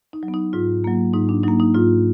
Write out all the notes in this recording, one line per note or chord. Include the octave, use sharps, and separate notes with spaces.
D#4
F#3
B3
D#4
G#2 F4
F#3 A#3
G#2 D#4
D4
F#3 A#3 D#4
D#4
G#2 F4